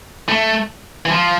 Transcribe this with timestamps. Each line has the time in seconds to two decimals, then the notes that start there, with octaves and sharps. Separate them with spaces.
0.29 A3
1.06 E3
1.11 F3